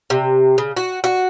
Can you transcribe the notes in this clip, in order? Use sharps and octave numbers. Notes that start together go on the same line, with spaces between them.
C3
C#3
F#4
F#4